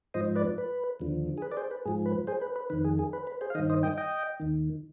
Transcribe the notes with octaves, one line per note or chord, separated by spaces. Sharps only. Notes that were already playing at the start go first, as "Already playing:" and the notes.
G#2 F3 C5 D#5
B4 D5
B4
D#2 D3 F3
G#4
B4
D5
G#4 C5
B4
G#2 F3 G#4
B4
G#4 C5
B4
B4
F2 D#3 B4
G#4
G#4
B4
B4
G#4 C5
F5
G2 D#3 C5 D#5
C5 D#5
D#5 G5
D#5 G5
D#2 D#3